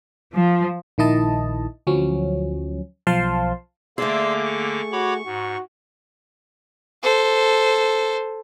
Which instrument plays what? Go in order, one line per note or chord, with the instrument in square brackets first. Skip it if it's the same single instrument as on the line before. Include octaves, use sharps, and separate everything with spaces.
[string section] F3
[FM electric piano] A#1 D#3 E4 D#5 A5
D2 F3 F#3 C#4
B1 F3 C5 F5 A5 C6
[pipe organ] D3 A#3 D6 [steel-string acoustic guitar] A3 G#4 [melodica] D5 C6 E6
[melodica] C#6
[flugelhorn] F#4 [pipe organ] C#5 B5 D6
[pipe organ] G#2 [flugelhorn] F#4
[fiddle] A4 C5